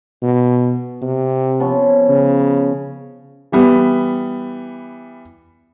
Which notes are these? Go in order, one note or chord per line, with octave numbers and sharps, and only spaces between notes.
B2
C3
F3 B3 C#4
C#3
E3 G3 B3